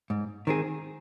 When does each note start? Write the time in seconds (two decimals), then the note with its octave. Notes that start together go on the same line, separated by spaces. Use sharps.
0.10 G#2
0.47 D#3 C4 G#4